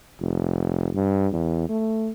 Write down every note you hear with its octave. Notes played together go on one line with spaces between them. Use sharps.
F1
G2
E2
A3